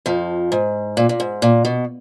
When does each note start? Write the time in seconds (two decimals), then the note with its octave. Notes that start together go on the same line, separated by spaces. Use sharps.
0.06 F2 F3
0.52 G#2
0.97 A#2
1.09 A#2
1.20 G#2
1.42 A#2
1.65 B2